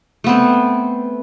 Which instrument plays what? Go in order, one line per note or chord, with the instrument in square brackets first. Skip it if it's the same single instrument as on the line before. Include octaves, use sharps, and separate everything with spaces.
[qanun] A3 B3 C4